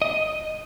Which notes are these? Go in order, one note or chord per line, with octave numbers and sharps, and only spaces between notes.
D#5